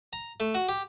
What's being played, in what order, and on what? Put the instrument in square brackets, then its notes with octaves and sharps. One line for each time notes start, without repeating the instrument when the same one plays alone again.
[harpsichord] A#5
A3
F#4
G4